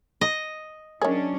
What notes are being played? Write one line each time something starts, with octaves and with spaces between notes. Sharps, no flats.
D#5
D#3 F#3 C#4 D4 G#4 A#4 C#5